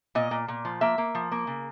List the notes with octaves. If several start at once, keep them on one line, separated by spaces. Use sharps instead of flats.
A#2 D#5
A#2
A#2
F3
A#3 E5
A#3
F3
A#3
C#3